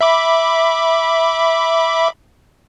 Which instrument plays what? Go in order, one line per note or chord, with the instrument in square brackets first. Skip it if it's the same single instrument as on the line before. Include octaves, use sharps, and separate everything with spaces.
[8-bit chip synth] E5 B5 D6